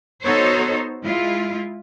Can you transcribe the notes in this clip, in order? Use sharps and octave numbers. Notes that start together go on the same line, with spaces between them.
B3 D#4 F#4 A4 C5 C#5
G#3 E4 F4